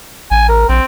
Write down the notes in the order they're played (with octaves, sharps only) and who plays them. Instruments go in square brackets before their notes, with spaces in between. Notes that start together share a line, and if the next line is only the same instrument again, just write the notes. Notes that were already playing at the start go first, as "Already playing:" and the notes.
[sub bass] A1 [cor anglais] G#5
[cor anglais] A#4
[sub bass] A#1 [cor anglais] C4